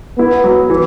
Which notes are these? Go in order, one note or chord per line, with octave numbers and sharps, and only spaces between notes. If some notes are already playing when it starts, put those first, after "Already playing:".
B3 E4
F#3
E3